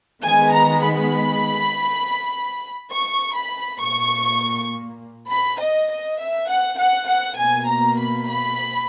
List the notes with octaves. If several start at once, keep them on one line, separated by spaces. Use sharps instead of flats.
D#3 G#3 B3 G#5
A#5
B5
C#6
B5
A#2 A#3 C#6
B5
D#5
D#5
E5
F#5
F#5
F#5
B2 A#3 G#5
A#5
B5
B5